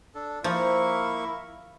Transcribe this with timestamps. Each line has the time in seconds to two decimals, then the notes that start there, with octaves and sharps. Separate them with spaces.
0.15 D4 A4
0.44 F3 A#3 E4 A#4 C#6